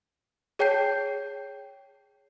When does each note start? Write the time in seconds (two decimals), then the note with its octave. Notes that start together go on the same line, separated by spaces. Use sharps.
0.59 G#4 C#5 G5 A5 G6 C7